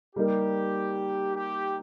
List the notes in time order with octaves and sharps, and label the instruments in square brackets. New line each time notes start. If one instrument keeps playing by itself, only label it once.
[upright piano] G3 A#3 D#4 A#4 [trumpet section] G4
[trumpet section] G4